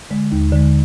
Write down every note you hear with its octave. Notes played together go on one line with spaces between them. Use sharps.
D3 G#3
D#2
D3 G#3